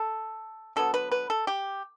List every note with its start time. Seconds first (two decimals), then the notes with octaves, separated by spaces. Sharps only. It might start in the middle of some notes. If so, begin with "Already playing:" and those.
Already playing: A4
0.76 D3 F#3 B3 A4
0.94 B4
1.12 B4
1.30 A4
1.47 G4